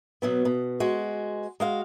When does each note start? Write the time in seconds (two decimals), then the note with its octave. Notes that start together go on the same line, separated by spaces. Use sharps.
0.22 B2 F#3 B3
0.45 B2
0.80 G#3 F#4
1.60 G#3 F#4 F5